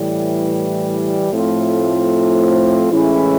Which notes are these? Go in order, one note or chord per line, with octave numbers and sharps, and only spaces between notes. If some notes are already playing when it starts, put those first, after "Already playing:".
Already playing: A2 E3 G3
A2 F3 A3 C4 F4
A2 E3 G#3 C#4 E4